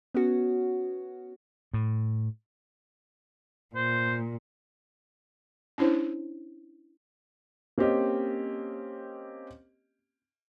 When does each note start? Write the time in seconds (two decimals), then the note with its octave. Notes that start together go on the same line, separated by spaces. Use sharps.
0.14 B3 C#4 F#4
1.74 A2
3.75 A#2 C5
5.78 C#4 D4 E4 C5 C#5
7.78 A#3 C4 C#4 G4 D#5